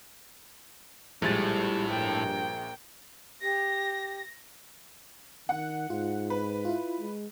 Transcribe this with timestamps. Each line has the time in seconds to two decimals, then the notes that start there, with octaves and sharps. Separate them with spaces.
1.22 A#1 A2 G3 G#3 A6
1.90 G2 A#3 G5
3.42 G4 A#6
5.49 D#3 F#5
5.90 G#2 F4
6.30 B4
6.65 E4 F4
7.00 G#3